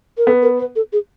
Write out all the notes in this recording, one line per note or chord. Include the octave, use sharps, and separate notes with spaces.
A#4
B3 A4
A#4
B4
A4
G#4